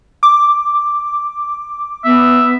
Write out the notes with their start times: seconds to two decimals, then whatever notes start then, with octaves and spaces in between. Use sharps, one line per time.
0.23 D6
2.05 B3 E5